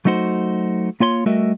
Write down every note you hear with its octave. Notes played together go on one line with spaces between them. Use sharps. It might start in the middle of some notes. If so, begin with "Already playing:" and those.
F#3 A3 D#4 F#4 C5
A#3 F4 C#5 C6
G3 A3 F#4 A#4 D#5 E5